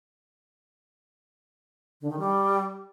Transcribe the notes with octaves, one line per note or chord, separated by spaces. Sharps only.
D3
D#3
G3